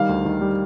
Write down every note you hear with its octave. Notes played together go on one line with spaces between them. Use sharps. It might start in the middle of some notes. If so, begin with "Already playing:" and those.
Already playing: D#3 G3 F5
D2
D#3
G3